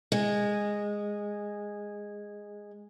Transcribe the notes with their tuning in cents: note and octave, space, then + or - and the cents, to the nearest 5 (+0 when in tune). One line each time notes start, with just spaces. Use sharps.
G#3 -10